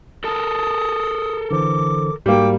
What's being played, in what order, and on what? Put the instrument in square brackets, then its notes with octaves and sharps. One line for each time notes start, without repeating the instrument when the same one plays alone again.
[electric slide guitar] A4 A#4 A5 [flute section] D#6
[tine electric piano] D3 E3 C5 [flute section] D6
[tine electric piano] G#2 F#4 [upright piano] G3 A#3 [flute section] G5 D6